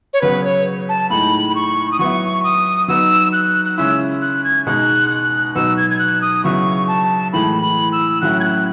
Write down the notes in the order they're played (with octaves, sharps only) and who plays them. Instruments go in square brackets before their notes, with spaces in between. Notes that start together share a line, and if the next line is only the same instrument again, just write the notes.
[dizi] C#5
[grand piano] C#3 F#3 B3 [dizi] B4
[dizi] C#5
A5
[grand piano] A2 G#3 D#4 [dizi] B5
[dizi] B5
C#6
D#6
[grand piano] F#3 B3 E4 [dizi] C#6
[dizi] D#6
[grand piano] F#3 B3 D#4 [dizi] E6
[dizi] F#6
F#6
[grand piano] C#3 G#3 C#4 E4 [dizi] E6
[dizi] F#6
G#6
[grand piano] B2 G#3 D#4 [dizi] F#6
[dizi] F#6
[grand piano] B2 F#3 B3 D#4 [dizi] E6
[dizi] G#6
G#6
F#6
D#6
[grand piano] C#3 F#3 B3 E4 [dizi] C#6
[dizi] A5
[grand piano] A2 E3 G#3 [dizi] B5
[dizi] B5
E6
[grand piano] A2 F#3 C#4 E4 [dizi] F#6
[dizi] G#6
F#6